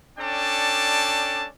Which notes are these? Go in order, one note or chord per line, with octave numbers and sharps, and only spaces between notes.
C#4 D4 A4 D5 G5 A5